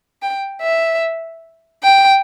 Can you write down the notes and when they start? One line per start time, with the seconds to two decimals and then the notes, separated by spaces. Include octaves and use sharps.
0.22 G5
0.62 E5
1.84 G5